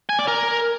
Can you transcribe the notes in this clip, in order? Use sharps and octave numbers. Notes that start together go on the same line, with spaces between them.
G#5
D5
A#4